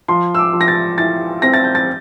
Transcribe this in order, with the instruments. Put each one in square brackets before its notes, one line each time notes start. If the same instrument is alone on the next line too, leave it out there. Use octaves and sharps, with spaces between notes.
[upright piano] F3 C6
E6
D6
F3
A#6
A6
E4 A6
C4 A#6
A6
G6
A6